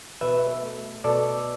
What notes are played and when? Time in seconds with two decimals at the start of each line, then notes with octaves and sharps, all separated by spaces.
0.21 B2 B4 E5
0.63 A3
1.04 B2 A4 D5